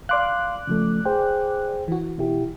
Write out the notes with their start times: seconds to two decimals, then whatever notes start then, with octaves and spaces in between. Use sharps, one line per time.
0.09 D5 F5 C6 D6 F#6
0.67 C#3 F3 A3
1.05 G#4 C5 G5
1.88 E3 F#4
2.18 B2 E4 G4